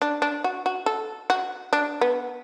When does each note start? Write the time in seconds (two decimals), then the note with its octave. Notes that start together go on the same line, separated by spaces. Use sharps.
0.02 D4
0.22 D4
0.44 F#4
0.66 F#4
0.86 A4
1.30 F#4
1.73 D4
2.01 B3